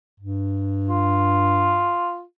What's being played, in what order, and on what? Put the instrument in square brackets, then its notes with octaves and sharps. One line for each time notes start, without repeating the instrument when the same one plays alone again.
[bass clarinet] G2
[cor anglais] F4